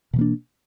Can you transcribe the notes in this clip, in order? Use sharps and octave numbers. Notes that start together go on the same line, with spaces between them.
B2 E3 A#3 D4